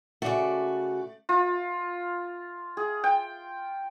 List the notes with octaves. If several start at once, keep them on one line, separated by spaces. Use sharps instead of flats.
C#3 A3 F#4 D5
F4
G#4
G5